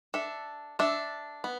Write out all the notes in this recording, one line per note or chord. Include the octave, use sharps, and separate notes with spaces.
D4 A4 E5
D4 A4 E5
B3